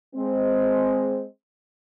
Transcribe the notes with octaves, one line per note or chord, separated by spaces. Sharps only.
G#3 C4